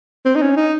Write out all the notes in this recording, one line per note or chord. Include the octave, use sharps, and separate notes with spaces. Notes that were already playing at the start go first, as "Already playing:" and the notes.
C4
D#4
C#4
D#4